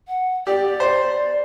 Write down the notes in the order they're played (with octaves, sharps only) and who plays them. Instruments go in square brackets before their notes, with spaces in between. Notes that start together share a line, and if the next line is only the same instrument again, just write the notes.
[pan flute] F#5
[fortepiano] G4 [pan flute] D5
[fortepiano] C5